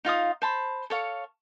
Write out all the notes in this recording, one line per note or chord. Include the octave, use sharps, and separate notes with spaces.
D#4 F4 F5 D#6
C5 A5 B5
A4 C#5 F5